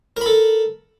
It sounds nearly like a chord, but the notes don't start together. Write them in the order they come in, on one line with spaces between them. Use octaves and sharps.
A#4 B5 A4